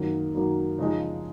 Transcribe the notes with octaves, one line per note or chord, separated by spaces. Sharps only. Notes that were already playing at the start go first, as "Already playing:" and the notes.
Already playing: F#2 D#3 F#3 A#3
F#2 D#3 F#3 A#3
C#3 F3 G#3 D#4 G#4